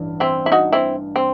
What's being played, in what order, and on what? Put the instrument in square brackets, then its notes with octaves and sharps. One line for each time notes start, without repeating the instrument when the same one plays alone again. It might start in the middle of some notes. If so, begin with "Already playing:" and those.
Already playing: [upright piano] A1 G2 E3
[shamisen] C4 E4
E4
D#4 F#4
C4 E4
C4